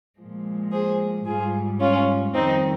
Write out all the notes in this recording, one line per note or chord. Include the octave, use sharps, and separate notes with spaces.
A#2 F3 G#3
G#4 C5
G#2 G3 F4 G#4
C#4 F4
F2 D#3 G3 C4 D#4